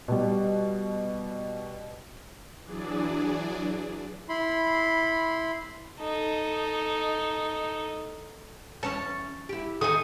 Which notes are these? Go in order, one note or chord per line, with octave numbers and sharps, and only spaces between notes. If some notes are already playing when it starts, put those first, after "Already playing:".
B2 G3
E3 F#3 D4 G#4 D5
E4 B5 C6
D#4 A4
E2 C#4 C#5 A5
E4 G4
E2 D#3 D#4 G#4 A4 D#6